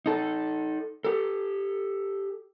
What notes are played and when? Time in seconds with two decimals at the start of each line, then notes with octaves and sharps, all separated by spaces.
0.06 D#4 A4
1.04 G4 A4